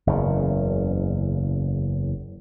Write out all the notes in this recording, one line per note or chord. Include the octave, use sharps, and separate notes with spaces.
F#1 E2 C#3